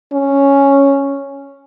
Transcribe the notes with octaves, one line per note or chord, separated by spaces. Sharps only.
C#4